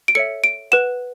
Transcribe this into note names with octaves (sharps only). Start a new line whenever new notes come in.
D7
A4 C#5 E5 C#7
D7
B4 F#5 E7